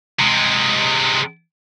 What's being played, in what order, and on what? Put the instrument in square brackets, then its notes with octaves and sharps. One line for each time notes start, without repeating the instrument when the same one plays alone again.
[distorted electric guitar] C3 G#3